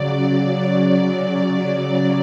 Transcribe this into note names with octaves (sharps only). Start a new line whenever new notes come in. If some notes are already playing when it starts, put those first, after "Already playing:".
Already playing: C#3 F#3 D5